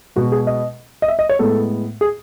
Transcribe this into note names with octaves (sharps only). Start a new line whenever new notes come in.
B2 G#3 B3 F#4
G#4
D#5
D#5
E5
D#5
C#5
A2 G#3 B3 A4
G#4